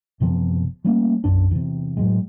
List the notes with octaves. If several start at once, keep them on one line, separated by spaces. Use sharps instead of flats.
F#1 C3 F3 B3
G3 A3 A#3 C#4
B1 F#2 D4
E2 C3
A2 F#3 G#3